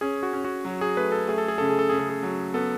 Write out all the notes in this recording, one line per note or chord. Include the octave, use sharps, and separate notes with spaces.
C#4 G#4
F#4
C#4
F#4
F#3
G#4
A3 B4
A4
A3 G#4
A4
G#4
C#3 A4
G#4
A4
C#3 G#4
A4
G#4
F#3
B3 A4